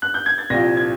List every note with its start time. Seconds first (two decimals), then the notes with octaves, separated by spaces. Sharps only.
0.02 F#6
0.14 G6
0.26 G#6
0.38 A6
0.50 C2 A#2 F3 A#6
0.77 G#6